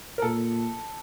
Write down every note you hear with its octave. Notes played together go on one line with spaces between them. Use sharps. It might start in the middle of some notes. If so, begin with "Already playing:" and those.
A#4
A#2 A4